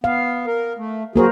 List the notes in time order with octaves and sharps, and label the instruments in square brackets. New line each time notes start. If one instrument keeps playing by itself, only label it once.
[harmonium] B3 [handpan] F5
[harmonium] A#4
A3
[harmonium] F#3 F#4 G#4 [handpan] A#3 A#4 C5